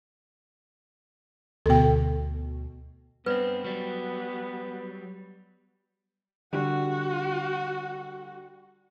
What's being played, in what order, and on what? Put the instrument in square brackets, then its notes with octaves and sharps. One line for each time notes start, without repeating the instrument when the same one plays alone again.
[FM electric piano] D2 B2 [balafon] A4 G5
[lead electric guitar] G2 C4 [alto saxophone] B3 [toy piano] B4 D5
[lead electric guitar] F#3 G3
[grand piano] D3 G3 [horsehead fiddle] F#4 F#5